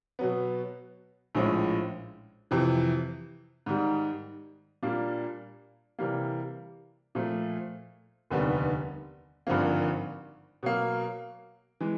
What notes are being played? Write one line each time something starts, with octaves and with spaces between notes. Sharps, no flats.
B2 F#3 B3
A#1 A2 F3 G#3 C#4
F2 C3 E3
G#2 D#3 G3
A#2 G3 A#3 D4
C3 E3 G3 A#3
A#2 F3 A3
F1 D#2 D3 G3 B3
G#1 G2 D3 F3 A#3
B2 F#3 A#3
E3 G#3